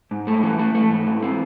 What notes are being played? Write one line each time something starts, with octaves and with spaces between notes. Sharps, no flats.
G#2
A3
E3
A3
A3
G#2
E3
C4